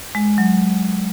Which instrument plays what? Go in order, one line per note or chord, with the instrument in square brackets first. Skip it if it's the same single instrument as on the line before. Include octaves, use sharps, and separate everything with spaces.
[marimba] G#3
F#3